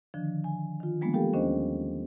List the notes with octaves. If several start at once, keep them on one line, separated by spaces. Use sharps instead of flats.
D3 D#3 F3 D4
G#5
D#3 F4
F3 G3 G#3 A#3 B3 D4
G4 A4 A#4 F5 G5
D#2 C#4 D4 C5 D#5